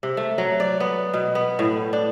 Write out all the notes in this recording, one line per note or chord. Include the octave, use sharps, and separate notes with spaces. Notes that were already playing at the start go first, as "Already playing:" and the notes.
C3
A3
F#3
D5
B3
B2
B3
A2
D4